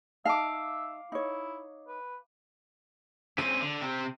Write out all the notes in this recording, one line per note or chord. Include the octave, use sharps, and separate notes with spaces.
D#4 E5 F5 A5 D6
D#4 E4 C#5
B4
C4 C#4 D#7
D3
C3 C4